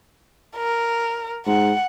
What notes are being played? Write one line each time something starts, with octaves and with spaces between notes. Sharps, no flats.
A#4
G#2 F#5